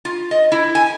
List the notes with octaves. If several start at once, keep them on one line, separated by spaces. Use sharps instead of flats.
F4
D#5
E4
G#5